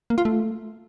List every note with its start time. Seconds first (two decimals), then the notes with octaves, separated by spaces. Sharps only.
0.10 A#3
0.18 F4
0.25 A3